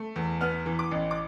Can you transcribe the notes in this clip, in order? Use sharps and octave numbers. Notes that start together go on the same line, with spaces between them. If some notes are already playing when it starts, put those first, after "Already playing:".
Already playing: A3
E2
B3 F6
E3
D6
A1
D6